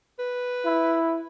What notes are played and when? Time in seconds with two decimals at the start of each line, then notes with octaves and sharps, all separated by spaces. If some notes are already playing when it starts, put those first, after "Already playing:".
0.19 B4
0.65 E4